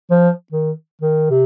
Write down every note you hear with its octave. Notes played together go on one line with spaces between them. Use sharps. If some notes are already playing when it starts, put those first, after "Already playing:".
F3
D#3
D#3
C3